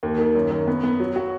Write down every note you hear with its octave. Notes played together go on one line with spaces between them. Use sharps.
D#2
D#3
F#2
F#2
B3
B3
F#3
F#4